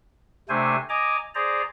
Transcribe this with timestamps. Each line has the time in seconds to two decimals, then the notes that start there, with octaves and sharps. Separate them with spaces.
0.49 C3 A3 D4 C5 G#5
0.89 D#5 G#5 A#5 D6
1.35 G#4 C5 D5 A#5